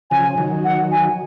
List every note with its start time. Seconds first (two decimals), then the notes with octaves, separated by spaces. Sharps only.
0.11 C#3 F3 G#5
0.37 D#3 F#3
0.64 F#5
0.91 G#5